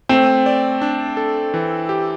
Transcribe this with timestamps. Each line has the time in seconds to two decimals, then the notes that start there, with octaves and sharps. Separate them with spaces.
0.09 A3 C4
0.46 D5
0.82 D4
1.17 A4
1.54 E3
1.89 G4